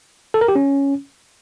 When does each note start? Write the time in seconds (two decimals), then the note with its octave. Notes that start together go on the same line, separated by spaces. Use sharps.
0.34 A4
0.41 A#4
0.48 G4
0.55 C#4